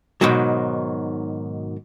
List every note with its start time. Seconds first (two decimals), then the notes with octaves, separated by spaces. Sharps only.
0.21 G#2 B2 D#3 F#3